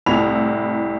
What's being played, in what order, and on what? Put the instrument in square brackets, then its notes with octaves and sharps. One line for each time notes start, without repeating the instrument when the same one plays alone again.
[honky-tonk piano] C2 A2 E4 B5 F7